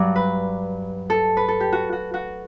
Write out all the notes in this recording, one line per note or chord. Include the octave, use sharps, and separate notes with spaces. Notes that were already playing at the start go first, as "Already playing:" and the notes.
Already playing: G2 F#3 D5
B4
A4
B4
A4
G4
F#4
F#4
F#4